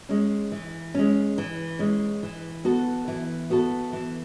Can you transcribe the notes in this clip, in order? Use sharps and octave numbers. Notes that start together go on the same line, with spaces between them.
G#3 C#4
E3
G#3 C#4
E3
G#3 C#4
E3
B3 F#4 A4
E3
B3 F#4 A4
E3